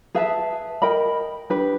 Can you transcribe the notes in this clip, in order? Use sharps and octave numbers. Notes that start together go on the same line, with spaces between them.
G#4 B4 E5 A5
A#4 D#5 G5 B5
D4 G4 B4